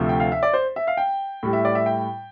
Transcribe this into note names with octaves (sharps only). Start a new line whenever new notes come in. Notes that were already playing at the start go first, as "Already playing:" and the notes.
Already playing: D2 C3 F3 A3
G5
F5
E5
D5
C5
E5
F5
G5
A2 G3
E5
D5
E5
G5